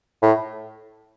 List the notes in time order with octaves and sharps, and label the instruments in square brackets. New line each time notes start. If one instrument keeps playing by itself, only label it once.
[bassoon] A2